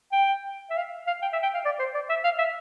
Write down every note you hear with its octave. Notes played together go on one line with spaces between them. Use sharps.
G5
E5
F5
F5
G5
E5
G5
F5
D5
C5
D5
E5
F5
E5